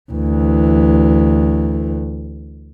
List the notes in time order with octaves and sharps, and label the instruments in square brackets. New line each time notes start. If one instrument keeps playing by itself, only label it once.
[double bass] D2 E3